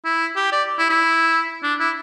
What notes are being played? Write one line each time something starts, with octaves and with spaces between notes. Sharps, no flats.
E4
G4
D5
E4
E4
D4
E4